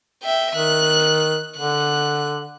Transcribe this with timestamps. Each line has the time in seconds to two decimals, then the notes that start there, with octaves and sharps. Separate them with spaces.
0.23 E5 G5
0.55 D#3 F#6
1.58 D3 F#6